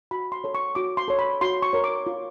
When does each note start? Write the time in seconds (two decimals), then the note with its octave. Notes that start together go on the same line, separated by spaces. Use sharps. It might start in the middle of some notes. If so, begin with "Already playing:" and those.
0.11 F#4 B5
0.32 C6
0.44 A4 C#5
0.55 C#6
0.75 F#4 D6
0.97 C6
1.08 A4 C#5
1.19 B5
1.41 F#4 C6
1.62 C#6
1.73 A#4 C#5
1.84 D6
2.07 F4